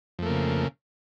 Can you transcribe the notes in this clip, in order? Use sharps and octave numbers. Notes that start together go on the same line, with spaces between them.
F2 C#3 A3 A#3